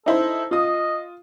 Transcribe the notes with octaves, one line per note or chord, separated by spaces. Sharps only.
D#4 E4 A4 C5
F4 D#5 D#6